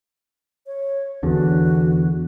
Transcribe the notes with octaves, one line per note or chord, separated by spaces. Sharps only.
C#5
E2 D3 F#4